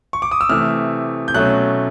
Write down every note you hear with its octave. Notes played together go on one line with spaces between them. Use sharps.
C#6
D6
D#6
E6
C3 E3 A3 F6
G6
B2 F#3 A3 C#4 F#6